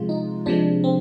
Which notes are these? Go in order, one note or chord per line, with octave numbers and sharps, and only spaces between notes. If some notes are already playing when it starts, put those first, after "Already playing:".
Already playing: C3 F3 G#3 F4
D#4
C3 F3 G#3 D4
C4